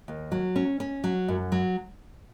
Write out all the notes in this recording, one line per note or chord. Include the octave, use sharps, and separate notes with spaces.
D#2
F#3
C#4
C#4
F#3
F#2
F#3